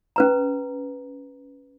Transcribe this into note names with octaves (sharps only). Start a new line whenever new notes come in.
C#4 B4 A#5